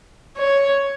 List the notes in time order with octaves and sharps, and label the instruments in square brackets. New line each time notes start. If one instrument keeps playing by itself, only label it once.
[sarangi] C#5